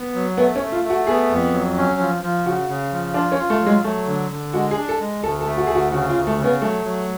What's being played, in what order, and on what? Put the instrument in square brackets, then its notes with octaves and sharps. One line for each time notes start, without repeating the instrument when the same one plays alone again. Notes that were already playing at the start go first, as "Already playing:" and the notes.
Already playing: [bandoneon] B3
F#3
[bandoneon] A3 [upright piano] B3
[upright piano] C#4
[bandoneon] A3
[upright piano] F4
[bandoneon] A3
[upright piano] F#4
[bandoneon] B3 [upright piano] G#4
[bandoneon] F2
F#3
C#4
F3
F3
[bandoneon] C#3 [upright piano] F#4
[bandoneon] C#3
F3
[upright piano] D4 [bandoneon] F4
[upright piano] C#4
[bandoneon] F4
[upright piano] A3
[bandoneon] F#3
[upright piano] G#3
[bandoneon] F#3 [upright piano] A3
[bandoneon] D3
D3
[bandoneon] G#3 [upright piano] F#4
[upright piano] G#4
[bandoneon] D4
[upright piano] A4
[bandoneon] G#3
[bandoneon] D2 [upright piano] A4
[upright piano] A4
[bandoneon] A3
[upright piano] F#4
[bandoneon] D2 [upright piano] G#4
[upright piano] F#4
[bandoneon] C#3 [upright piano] F#4
[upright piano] F4
[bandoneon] D2
[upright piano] A3
[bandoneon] C#3
[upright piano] B3
[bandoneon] F#3 [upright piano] A3
[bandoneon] F#3